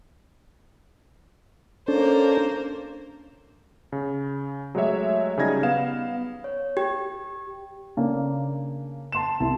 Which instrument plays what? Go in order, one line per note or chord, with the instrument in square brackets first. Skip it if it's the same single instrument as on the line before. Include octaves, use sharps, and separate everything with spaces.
[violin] A#3 C5 [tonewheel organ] C#4 D4 A4
[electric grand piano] C#3
F#3 G#3 A3 G4 C#5 E5
C#3 F#3 G3 D#4 G#6 A#6
B3 F5 E7
[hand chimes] C#5
G4
[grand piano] C#3 A#3 D4
A5 C6 E7
C2 E4 A5